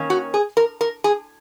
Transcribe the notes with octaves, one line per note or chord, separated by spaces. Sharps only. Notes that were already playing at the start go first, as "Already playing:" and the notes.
Already playing: D#3 A#3 C#4
F#4
G#4
A#4
A#4
G#4